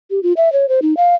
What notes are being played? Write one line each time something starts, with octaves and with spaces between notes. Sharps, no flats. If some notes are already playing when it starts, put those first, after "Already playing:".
G4
F4
E5
C#5
C5
D#4
F5